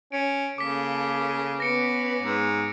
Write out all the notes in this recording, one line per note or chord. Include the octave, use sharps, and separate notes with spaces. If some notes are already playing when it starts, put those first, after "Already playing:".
C#4 D7
C#3 A#3 A4 D6 B6
B3 C#4 B4 A#6 C#7 D7
G#2